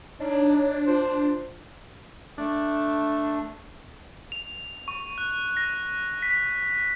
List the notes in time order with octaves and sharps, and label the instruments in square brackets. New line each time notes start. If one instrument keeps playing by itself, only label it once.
[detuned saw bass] D4 [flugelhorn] D#4 [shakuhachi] C#5
[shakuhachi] F4 [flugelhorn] C5
[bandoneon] A3 [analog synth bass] D4
[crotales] F7
C#6
F#6
A#6
B6